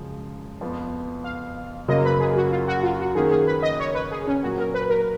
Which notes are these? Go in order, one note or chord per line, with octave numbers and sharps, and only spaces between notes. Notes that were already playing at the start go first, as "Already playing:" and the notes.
Already playing: F#2 C#3 F3 G#3
F2 F3 B3
F5
F#2 C#3 F#3 A#3 D#5
B4
G#4
F#4
F4
F#4
F4
F#4
D#3 A#3 C#4 G#4
G#4
B4
D#5
C#5
B4
G#4
C#4
A#2 F#3 A#3 F#4
A#4
B4
A#4